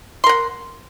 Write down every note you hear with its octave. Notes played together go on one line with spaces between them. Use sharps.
A#4 F#5 C6